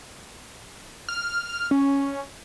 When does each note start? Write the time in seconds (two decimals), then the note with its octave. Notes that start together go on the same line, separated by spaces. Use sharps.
1.09 F6
1.71 C#4